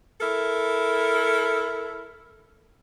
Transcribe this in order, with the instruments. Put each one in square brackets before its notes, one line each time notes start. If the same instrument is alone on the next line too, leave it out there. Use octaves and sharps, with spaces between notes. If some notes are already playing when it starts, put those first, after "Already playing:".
[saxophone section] E4 A4 A#4